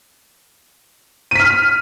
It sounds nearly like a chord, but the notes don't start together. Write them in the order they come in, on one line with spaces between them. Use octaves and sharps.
D#7 B6 F6